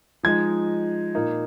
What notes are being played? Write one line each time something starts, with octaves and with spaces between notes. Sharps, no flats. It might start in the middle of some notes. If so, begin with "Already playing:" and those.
F3 G#3 D#4 G#6
A#2 A#3 D#4